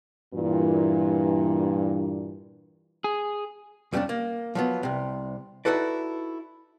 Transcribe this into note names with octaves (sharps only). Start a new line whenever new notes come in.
G2 A#2 E3
G#4
F2 G3 A#3 B3 C#4 D4
A#3
F3 F#3 B3
C2 C3
D#4 E4 F#4 A4 B4 D5